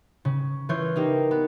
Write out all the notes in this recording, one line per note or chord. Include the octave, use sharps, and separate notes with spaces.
C#3
E3 F4 C#5 G6
A#3 D#4 G4
B3